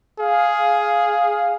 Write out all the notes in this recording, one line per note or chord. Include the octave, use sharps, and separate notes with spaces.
G#4 F5